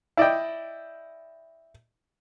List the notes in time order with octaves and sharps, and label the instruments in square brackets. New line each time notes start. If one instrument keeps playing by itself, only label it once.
[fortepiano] E4 D5 D#5 G5